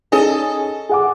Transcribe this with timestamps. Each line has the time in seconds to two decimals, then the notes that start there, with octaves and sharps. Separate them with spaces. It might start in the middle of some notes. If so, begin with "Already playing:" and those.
0.12 C#4 D#4 G#4 A4 D#5
0.89 G#4 F#5 D6